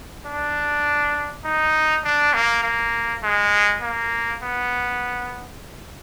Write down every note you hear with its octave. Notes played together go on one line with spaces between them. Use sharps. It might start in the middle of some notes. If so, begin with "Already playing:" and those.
D4
D#4
D4
A#3
A#3
G#3
A#3
B3